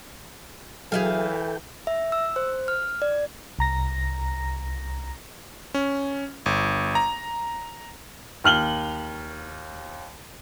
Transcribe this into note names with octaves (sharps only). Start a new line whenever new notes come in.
E3 F#3 G#4 A4 E5 F5 G5
E5
E6
C5
F6
D5
C2 A#5 A#6
C#4
G1
A#5
D#2 F6 F#7 G7